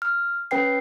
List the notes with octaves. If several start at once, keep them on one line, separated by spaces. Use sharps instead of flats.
F6
C#4 B4 G5 C7